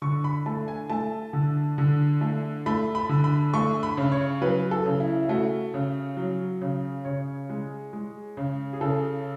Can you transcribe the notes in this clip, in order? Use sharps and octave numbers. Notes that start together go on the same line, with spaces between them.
D3 C#6
B5
A3 A5
G#5
A3 A5
D3
D3
A3
A3 B5
B5
D3
B5
A3 C#6
B5
C#3
C#5
F#3 B4
A4
C#3
E4
E4
A3 F#4
C#3
F#3
C#3
C#3 C#5
G#3
G#3
C#3
G#4
C#3 A4